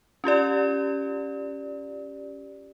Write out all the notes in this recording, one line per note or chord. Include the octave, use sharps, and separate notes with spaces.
C#4 F4 G4 D5